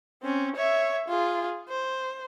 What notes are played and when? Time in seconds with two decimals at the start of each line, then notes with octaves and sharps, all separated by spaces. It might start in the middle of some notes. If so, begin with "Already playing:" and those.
0.23 C4 C#4
0.56 C#5 E5
1.08 F4 G#4
1.68 C5